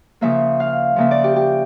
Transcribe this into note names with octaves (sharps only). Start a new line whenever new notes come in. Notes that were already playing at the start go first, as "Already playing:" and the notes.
C#3 F3 A#3 E5
F5
C#3 F3 A#3 E5
D5
G4
G4